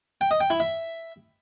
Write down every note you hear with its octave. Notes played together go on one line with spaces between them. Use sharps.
G5
D#5
G5
E4
E5